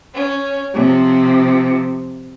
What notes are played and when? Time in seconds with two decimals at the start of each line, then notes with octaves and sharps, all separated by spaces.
0.13 C#4
0.73 C3 F3